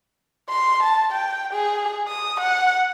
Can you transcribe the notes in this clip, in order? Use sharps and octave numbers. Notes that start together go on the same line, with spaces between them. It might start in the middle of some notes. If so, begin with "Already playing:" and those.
C6
A5
G5
G#4
D#6
F#5